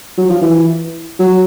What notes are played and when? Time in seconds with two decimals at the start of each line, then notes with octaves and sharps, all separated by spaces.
0.18 F#3
0.30 F3
0.42 E3
1.19 F#3